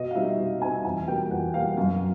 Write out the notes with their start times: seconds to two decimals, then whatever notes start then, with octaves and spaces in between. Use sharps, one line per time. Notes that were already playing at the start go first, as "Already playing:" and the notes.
Already playing: B2 D#5
0.11 F5
0.15 G3 C4 D#4 E5
0.38 B2
0.61 G3 C4 D#4 G#5
0.85 E2 G#5
1.08 B2 G3 A#3 G5
1.30 E2 F#5
1.54 B2 G3 A#3 F5
1.77 F#2 F5